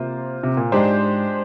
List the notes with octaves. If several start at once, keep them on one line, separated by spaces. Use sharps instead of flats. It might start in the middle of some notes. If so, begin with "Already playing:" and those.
Already playing: C3 A#3 F4 C5
C3
A#2
G#2 G#3 D4 G4 C5